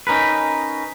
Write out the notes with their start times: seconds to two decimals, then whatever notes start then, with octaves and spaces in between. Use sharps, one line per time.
0.07 C#4 D#4 A#4 B4